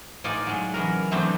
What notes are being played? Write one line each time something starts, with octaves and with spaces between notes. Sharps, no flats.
A2 D#4 F4 D5 G#5
F#3 G#3
C#3 E3 F#3 A#4
E3 F#3 A3 B3 C4 D4